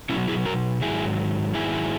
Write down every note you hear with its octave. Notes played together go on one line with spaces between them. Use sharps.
B2 F#3 C#4 E4
E4 G#4
F#4 A#4
G#2 D#3 F#3 E4 G#4
G#2 D#3 F#3 E4 G#4